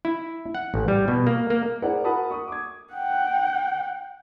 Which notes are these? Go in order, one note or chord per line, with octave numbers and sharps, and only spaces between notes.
E4
F#5
A1
G3
B2
A#3
A#3
E4 G#4 A#4 C5 D5 F#5
F#4 A#4 F#5 A5 B5 D#6
C#6 D#6
D6 G#6
F#5 G5